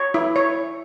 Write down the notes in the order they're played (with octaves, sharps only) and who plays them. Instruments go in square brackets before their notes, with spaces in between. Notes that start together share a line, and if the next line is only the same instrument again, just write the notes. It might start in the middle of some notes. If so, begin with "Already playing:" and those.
Already playing: [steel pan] C#5
E4
C#5